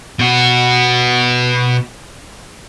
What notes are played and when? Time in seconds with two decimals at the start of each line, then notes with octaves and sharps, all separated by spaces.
0.19 B2 F#4